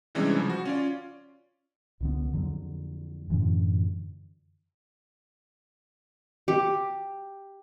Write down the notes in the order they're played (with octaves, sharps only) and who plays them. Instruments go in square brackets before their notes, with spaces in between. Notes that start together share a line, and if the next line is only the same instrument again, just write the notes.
[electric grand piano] C3 E3 G3 G#3 C#4 D4
C#3 F3
F#4
C#4 F4 D5
[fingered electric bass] C#2 D3 B3
F2 D3 F#3
F#2 A2 D3 E3
[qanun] G4